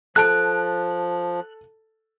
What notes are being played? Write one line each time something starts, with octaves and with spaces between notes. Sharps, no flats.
F3 A4 A5 F#6 D7